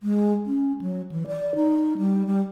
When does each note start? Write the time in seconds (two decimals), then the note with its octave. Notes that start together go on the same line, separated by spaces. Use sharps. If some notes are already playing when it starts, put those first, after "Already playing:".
0.03 G#3
0.46 C#4
0.81 F#3
1.12 E3
1.27 D5
1.55 D#4
1.98 G3
2.27 G3